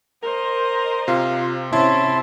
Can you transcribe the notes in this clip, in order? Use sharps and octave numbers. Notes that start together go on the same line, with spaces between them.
A#4 C5 D#5 A#5
C3 F4
C3 C#4 E4 E5 A5 C6